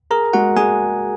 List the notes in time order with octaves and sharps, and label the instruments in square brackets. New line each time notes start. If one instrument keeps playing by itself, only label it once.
[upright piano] G#4 [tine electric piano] A#4 A#5
[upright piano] G#3 [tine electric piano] F#4 F#5
[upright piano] G#3 [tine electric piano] G#4 G#5